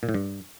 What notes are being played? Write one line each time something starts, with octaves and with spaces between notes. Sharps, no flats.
A#2
A2
G2